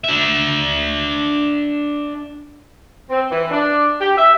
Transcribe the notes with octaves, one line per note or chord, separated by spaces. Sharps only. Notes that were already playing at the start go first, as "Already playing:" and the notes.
D4 E5
C4
E3
D4
G4
E5